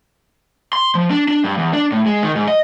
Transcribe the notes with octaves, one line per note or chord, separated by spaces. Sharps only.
C6
F3
D4
D4
G2
E2
D4
A2
G#3
D#3
G#2
D#5